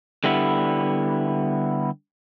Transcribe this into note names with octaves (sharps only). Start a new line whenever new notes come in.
D3 G3 B3 E4